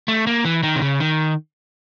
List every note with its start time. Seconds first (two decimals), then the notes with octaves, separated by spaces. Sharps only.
0.08 A3
0.27 A#3
0.45 E3
0.63 D#3
0.76 C3
0.82 C#3
1.00 D#3